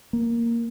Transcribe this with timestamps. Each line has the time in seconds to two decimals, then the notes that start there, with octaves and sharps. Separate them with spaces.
0.13 A#3